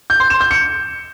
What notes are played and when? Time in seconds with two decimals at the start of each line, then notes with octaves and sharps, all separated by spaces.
0.10 G6
0.20 C6
0.30 E7
0.41 G6
0.51 C#7